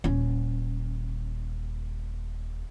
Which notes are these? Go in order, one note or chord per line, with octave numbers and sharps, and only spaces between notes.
D#1 C#4